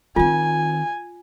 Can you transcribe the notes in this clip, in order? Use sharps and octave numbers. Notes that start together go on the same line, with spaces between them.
D#3 C4 F4 G#5